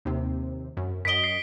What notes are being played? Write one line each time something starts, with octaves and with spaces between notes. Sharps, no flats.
D#2 C3
F#2
F#2 D#5 B6 D7 G7
C7